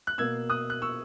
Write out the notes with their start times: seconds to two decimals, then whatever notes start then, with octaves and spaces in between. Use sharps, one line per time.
0.07 F#6
0.18 B2 A#3 E6 G#6
0.50 D#6 F#6
0.70 F#6
0.82 C#6 E6